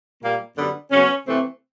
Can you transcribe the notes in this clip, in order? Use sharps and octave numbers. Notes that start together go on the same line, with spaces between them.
A#2 G3 A#3
F#2 D3 G3 B3
C#3 F#3 B3 C#4
C3 E3 A3 C4